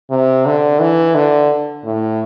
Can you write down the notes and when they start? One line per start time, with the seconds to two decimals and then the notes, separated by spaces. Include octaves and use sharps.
0.10 C3
0.46 D3
0.80 E3
1.15 D3
1.85 A2